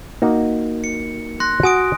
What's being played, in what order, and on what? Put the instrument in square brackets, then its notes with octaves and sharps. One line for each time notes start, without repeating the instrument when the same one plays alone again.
[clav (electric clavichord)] A#3 D#4 F#4
[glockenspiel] C#7
C6 F#6 A#6
[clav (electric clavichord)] F#4 [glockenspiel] G#5 D#6 D7